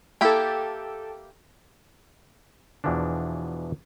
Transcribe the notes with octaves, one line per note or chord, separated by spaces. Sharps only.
A#3 E4 G4 A4 G5
E2 B2 E3 F3 D4